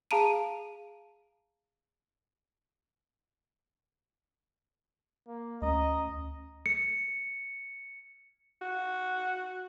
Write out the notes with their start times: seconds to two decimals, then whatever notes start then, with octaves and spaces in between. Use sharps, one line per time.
0.11 G#4 F5 A5 A#5 D7 D#7
5.28 A#3
5.62 D2 C#4 D#5 A#5
6.66 C#7
8.62 F#4